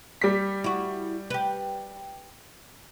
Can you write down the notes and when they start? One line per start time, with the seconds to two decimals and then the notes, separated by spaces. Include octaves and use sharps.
0.21 G3 B6
0.64 E4 F#4
1.30 G4 B4